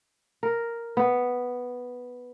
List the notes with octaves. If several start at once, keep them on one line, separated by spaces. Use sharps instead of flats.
A#4
B3